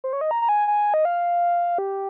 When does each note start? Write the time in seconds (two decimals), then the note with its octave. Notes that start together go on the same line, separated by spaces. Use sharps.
0.04 C5
0.13 C#5
0.21 D#5
0.31 A#5
0.42 A#5
0.49 G#5
0.68 G#5
0.94 D#5
1.05 F5
1.78 G4